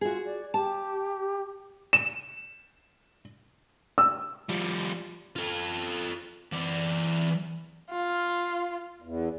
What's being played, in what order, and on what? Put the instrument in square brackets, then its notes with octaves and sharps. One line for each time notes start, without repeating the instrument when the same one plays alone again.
[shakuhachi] F4 [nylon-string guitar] F#4 G#4
[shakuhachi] D5
[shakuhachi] G4 [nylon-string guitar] A5
[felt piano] E7
E6
[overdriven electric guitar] F3 G3
[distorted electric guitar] F4 A4
E3 D5
[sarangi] F4
[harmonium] E2